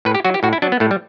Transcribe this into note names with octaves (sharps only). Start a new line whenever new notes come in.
A2 B4
G4
F#3 F#4
G4
A2 F#4
E4
F#3 D4
B3
A2 A3
G3